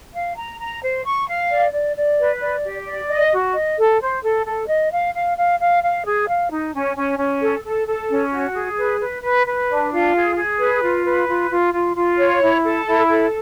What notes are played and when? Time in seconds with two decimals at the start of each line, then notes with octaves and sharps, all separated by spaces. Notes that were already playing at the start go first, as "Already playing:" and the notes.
0.14 F5
0.37 A#5
0.60 A#5
0.83 C5
1.05 C#6
1.28 F5
1.50 D5
1.73 D5
1.97 D5
2.19 B4
2.41 D5
2.64 G4
2.87 D5
3.10 D#5
3.32 F#4
3.55 D#5
3.78 A4
4.01 C5
4.23 A4
4.46 A4
4.68 D#5
4.92 F5
5.14 F5
5.37 F5
5.60 F5
5.83 F5
6.05 G#4
6.28 F5
6.51 D#4
6.74 C#4
6.97 C#4
7.18 C#4
7.42 A4
7.64 A4
7.87 A4
8.10 C#4
8.32 F#4
8.55 G#4
8.78 B4
9.00 B4
9.23 B4
9.46 B4
9.69 D4
9.91 F4
10.15 G#4
10.36 G#4
10.59 B4
10.82 F4
11.05 B4
11.28 F4
11.50 F4
11.73 F4
11.95 F4
12.19 C#5
12.41 E4
12.64 A4
12.87 E4
13.09 A4